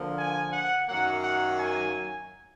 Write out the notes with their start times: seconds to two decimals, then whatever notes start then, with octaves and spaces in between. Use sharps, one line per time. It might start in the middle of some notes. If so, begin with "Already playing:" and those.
Already playing: D3 F3 A#3
0.18 G#5
0.52 F#5
0.87 F#2 D#3 F#3 A#3 F#5
1.22 F#5
1.56 G#5